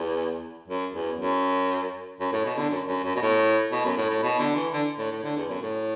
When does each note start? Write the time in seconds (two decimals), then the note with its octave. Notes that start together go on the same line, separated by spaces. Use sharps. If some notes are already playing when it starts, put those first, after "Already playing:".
Already playing: E2
0.67 F#2
0.93 E2
1.18 F#2
2.20 F#2
2.32 A2
2.45 B2
2.57 D3
2.70 F#2
2.87 F#2
3.04 F#2
3.16 B2
3.22 A2
3.72 B2
3.84 F#2
3.97 A2
4.10 A2
4.22 B2
4.39 D3
4.56 E3
4.73 D3
4.98 A2
5.11 A2
5.24 D3
5.36 E2
5.49 F#2
5.62 A2